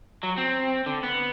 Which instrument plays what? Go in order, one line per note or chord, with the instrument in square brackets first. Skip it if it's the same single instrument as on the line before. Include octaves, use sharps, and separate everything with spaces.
[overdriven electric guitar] F#3
C4
D3
B3